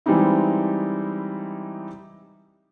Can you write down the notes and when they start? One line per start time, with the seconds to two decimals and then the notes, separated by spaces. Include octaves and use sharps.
0.06 E3 G3 G#3 C4 D#4 E4